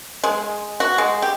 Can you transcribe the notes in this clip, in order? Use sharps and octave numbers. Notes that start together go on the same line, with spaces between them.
G#3
F#4
G#3
G4